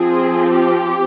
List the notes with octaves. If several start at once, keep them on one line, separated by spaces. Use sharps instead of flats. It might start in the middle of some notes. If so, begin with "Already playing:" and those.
Already playing: F3 C4 G#4
G4